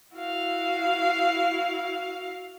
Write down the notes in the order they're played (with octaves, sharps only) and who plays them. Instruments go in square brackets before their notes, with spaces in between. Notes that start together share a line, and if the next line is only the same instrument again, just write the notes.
[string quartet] E4 F#4 F5